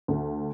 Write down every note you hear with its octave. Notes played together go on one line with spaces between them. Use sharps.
D2